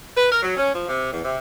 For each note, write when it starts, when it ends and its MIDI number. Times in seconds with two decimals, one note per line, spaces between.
0.16 0.30 71
0.31 0.39 70
0.43 0.55 54
0.57 0.71 61
0.73 0.83 53
0.88 1.09 48
1.12 1.21 40
1.25 1.37 48